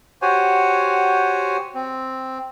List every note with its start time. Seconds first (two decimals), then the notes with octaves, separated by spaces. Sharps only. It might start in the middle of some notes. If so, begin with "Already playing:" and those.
0.22 F#4 G4 C5 C#5 F#5 G#5
1.75 C4